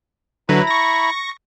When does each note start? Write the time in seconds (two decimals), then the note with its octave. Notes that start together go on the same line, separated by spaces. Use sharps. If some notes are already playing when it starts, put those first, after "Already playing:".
0.49 D3 F#3 E4 B4 A#5 B5
0.67 C#6 A#6